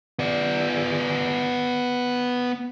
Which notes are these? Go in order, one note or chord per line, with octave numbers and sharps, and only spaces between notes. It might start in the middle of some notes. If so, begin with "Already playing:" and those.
B3 D5